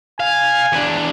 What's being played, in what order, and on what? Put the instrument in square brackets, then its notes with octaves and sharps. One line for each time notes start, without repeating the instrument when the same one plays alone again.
[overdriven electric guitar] F5 [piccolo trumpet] G#5
[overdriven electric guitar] E2 D4